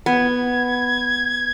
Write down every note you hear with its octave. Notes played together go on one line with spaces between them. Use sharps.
B3 G#6